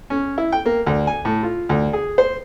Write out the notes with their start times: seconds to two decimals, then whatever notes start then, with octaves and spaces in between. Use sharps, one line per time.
0.10 C#4
0.38 E4
0.52 G5
0.66 A#3
0.86 D2
1.07 G#5
1.25 A2
1.43 F4
1.69 D2
1.93 G#4
2.18 C5